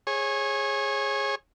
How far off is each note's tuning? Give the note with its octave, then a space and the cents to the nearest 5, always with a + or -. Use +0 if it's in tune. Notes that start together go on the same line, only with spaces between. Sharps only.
G#4 +0 C#5 -25